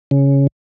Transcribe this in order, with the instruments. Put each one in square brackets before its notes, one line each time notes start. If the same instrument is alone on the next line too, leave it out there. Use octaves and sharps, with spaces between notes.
[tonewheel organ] C#3